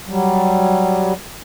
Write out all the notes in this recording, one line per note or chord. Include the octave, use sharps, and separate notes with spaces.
F#3 G3